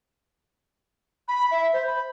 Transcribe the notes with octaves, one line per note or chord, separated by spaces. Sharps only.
B5
E5
C5
B5